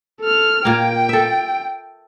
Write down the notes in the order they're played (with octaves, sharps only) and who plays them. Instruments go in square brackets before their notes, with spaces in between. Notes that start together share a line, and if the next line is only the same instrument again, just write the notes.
[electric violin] A4 F6
[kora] A#2 A#3 [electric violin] G5
[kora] A4 E5